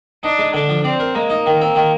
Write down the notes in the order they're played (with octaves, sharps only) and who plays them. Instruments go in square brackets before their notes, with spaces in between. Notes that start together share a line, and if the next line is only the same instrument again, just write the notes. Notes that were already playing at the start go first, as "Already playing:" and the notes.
[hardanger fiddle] D4 [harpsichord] D#4
[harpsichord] G#3
[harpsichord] D3 [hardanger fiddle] D4
[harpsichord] F3
[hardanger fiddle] C4 [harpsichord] D5
[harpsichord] A#4
[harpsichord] G#3 [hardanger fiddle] A#3
[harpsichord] D#4
D#3
C4
D#3